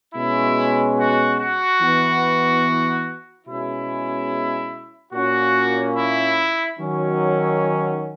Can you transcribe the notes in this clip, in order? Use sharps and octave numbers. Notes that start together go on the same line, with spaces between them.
B2 G#3 C#4 E4
F#4
F#4
E3 B3
B2 G#3 C#4 E4
A#2 A#3 C#4 F#4
E4
D#3 F#3 C#4